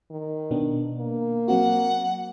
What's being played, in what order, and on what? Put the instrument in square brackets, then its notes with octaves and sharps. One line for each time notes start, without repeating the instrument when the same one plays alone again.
[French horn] D#3
[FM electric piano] B2 B3 D4
[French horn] A#3
[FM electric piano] F#3 C4 F#4 [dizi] F#5